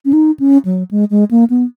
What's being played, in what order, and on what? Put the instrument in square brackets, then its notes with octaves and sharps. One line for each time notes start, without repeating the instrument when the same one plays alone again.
[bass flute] C#4
D#4
C#4
F#3
G#3
G#3
A#3
B3